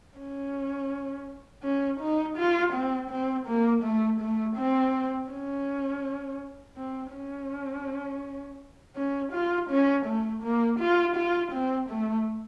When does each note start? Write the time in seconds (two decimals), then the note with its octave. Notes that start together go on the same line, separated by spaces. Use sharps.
0.18 C#4
1.64 C#4
2.00 D#4
2.37 F4
2.73 C4
3.10 C4
3.47 A#3
3.84 A3
4.20 A3
4.56 C4
5.31 C#4
6.77 C4
7.13 C#4
8.96 C#4
9.33 F4
9.70 C#4
10.06 A3
10.43 A#3
10.79 F4
11.16 F4
11.52 C4
11.90 A3